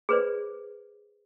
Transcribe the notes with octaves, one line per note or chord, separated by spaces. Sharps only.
G#4 B4 C5 D5